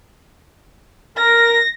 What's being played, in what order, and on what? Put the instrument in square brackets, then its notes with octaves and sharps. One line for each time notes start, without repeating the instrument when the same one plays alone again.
[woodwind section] A#4 [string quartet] A#6